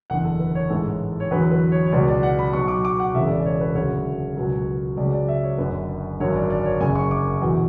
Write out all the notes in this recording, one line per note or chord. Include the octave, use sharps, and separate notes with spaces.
F#1 E2 D3 F#5
A4
B4
C#5
A1 G#2 E3 A4
C#5
E2 D3 F#3 B4
B4
C#5
C#5
C#2 B2 F#3 D5
D5
F#5
B5
B1 B2 F#3 C#6
D6
D6
F#5
E1 E2 C#3 E5
D5
D5
C#5
B4
D2 C#3 F#3 C#5
C#2 B2 F#3
C#2 C#3 F#3 D5
D5
E5
C#5
F#1 F#2 D3 B4
G#1 F#2 D3 F#3 C#5
D5
D5
C#5
F#1 F#2 C#3 G#5
C#6
D6
E2 B2 F#3